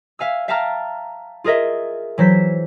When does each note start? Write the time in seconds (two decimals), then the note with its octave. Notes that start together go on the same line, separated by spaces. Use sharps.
0.19 E5 F5 G#5 E6
0.48 E5 F5 G5 A5 A#5 F6
1.44 F4 G#4 A#4 D#5 E5
2.18 E3 F#3 C5 B6